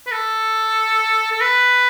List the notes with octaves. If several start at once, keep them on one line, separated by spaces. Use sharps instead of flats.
B4
A4
A4
B4